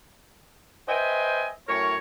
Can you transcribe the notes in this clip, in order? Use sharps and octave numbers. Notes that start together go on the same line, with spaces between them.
B4 C5 D#5 E5 G5 G#5
F#2 A2 A#4 C#5